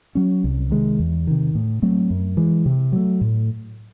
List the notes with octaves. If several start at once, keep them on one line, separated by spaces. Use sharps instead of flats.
F#3 C#4
C2
C3 D#3 G#3
E2
C3 D#3
A2
F#3 A3 C4
F#2
E3 G#3
C3
F#3 A3
A2